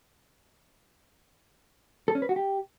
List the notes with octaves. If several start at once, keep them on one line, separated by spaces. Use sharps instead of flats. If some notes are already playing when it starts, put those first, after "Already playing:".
A4
C#4
B4
F#4
G4